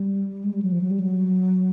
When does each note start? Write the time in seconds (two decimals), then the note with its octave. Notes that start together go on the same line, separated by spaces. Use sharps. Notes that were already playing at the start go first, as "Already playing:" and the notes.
Already playing: G3
0.44 G#3
0.53 G3
0.62 F#3
0.72 F3
0.81 F#3
0.91 G3
1.00 F#3